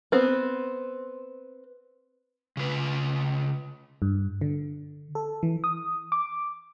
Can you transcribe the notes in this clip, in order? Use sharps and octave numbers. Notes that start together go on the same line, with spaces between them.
B3 C4
C#3 F4 B4
G2
D3
A4
E3
D#6
D6